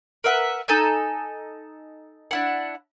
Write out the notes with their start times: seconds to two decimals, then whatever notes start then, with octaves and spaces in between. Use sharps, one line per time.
0.24 A#4 B4 E5 F#5
0.68 D#4 A4 G#5 G6
2.31 D4 E4 F#5